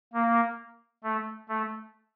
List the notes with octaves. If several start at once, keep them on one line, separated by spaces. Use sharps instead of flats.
A#3
A3
A3